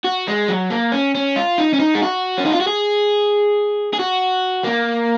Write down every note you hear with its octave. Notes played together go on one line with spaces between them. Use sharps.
F#4
G#3
F#3
A#3
C#4
C#4
F4
D#4
C#4
D#4
G#4
F#4
C#4
D#4
F4
F#4
G#4
G#4
F#4
A#3